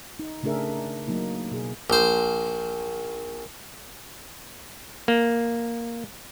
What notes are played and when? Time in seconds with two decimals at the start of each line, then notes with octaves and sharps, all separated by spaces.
0.19 D#4
0.43 C#3 A3 D4 G#4 A#4 E5
1.08 F#3 A#3 D#4
1.51 B2 G#4
1.90 A#1 C5
5.08 A#3